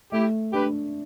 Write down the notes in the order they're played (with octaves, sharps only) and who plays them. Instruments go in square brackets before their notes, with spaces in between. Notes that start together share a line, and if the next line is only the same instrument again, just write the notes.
[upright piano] A3 [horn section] E4 G4
[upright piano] D4 [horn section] G4 B4